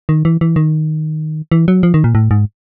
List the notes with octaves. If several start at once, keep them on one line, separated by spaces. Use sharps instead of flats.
D#3
E3
E3
D#3
E3
F#3
F3
D#3
A#2
A2
G#2